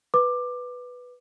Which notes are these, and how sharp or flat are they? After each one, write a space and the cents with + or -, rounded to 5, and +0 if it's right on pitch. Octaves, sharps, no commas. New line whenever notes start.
B4 +0 D6 +15